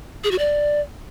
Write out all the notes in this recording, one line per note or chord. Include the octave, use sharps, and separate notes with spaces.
G#4
F#4
D5